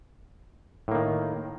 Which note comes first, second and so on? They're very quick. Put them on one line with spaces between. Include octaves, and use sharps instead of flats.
A2 A#3 D#3